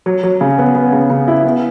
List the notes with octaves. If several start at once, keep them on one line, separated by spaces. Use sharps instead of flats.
F#3
F#3
C#3
B3
B3
C#3
C#3
E4
B3